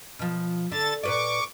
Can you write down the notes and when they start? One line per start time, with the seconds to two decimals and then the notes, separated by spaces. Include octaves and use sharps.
0.19 B2 F3
0.72 D3 A4 A6
1.03 A#2 B4 D5 C#6 D6